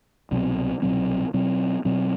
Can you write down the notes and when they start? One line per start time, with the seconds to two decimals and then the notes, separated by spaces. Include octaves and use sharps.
0.31 C2 B2 F#3 C4
0.82 C2 B2 F#3 C4
1.34 B2 F#3 C4
1.85 B2 F#3 C4